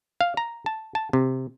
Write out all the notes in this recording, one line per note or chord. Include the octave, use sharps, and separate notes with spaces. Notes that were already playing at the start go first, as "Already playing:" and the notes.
F5
A#5
A5
A5
C3